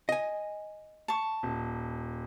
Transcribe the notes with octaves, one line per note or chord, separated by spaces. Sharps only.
D#5 G#5
A5 C#6
D#1